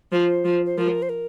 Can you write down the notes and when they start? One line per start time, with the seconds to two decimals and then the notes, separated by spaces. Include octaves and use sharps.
0.12 F3 C5
0.45 F3
0.66 C5
0.78 F3 A#4
1.02 C5
1.09 A#4